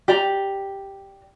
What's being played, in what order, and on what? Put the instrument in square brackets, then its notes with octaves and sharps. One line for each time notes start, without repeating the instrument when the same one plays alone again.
[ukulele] G4 D5 A#5